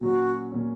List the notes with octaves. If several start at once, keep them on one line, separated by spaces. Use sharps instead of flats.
A#2 F#3 C#4 F#4
A#2 F#3 C#4